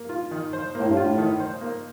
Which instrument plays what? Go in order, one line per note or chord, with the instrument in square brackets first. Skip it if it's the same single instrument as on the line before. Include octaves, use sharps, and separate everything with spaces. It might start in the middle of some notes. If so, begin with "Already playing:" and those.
Already playing: [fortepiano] A#3
F4
D#3
C5
[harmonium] A2 [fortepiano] A#3
[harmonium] G2
[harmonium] A2 [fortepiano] F4
[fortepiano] D#3
C5
A#3